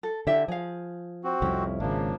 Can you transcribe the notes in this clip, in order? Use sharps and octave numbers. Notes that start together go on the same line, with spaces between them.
A4
D3 E4 G4 E5
F3 G#4 F5
C4 F#4
C2 F2 C#4 E4
G#1 C#3 F3 A#3 D4